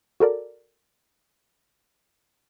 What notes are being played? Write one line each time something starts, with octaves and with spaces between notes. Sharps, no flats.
F#4 A4 A#4 D5